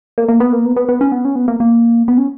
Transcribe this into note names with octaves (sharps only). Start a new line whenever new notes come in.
A#3
A#3
B3
A#3
B3
B3
B3
C#4
B3
C#4
B3
A#3
A#3
B3
C#4